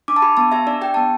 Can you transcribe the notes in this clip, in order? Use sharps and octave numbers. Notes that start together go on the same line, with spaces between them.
D4 D6
A5
G4 B5
B3 A5
G4 E5
D4 D5
G4 G5
B3 A5